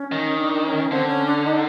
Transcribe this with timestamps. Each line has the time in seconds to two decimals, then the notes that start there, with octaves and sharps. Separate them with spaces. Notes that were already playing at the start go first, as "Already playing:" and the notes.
Already playing: C#4
0.12 D#3
0.38 D4
0.65 C#4
0.91 D3 C4
1.08 C#4
1.26 D4
1.45 D#4